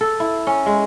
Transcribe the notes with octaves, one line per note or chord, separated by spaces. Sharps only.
A4
E4
C#4
G#3